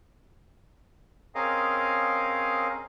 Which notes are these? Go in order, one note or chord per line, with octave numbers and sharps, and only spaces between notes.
C4 C#4 G#4 A#4 D#5 F5